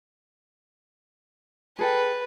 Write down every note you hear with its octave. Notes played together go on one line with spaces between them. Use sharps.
G#4 A4 B4 G5